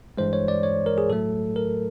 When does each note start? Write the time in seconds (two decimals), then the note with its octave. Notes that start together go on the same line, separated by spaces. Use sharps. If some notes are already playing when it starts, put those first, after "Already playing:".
0.18 G2 E3 G#3 C5
0.33 C#5
0.48 D5
0.63 C#5
0.86 A#4
0.98 G#4
1.10 A2 F#3 A3 A4
1.56 A#4